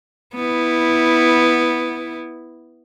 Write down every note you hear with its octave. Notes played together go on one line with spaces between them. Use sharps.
B3 E4